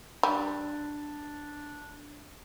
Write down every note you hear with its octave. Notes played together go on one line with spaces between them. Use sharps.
G3 D4